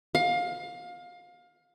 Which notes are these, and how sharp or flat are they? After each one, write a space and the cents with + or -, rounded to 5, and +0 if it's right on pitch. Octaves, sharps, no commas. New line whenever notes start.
F5 +25